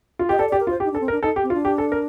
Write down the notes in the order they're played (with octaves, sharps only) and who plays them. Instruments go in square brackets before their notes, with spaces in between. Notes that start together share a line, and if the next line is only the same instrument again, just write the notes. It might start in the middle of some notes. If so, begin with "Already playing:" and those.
[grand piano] F4
[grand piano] G4 [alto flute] D#5
[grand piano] A4 [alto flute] D5
[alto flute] D5
[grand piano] G4
[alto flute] A#4
[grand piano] F4
[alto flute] C5
[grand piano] G4
[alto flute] D#4
D4
[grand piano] A4
[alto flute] C4
[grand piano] A#4
[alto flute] D4
[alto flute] D#4 [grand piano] A4
[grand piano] G4
[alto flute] C4
[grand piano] F4
[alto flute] D4
[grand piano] G4
A4
A#4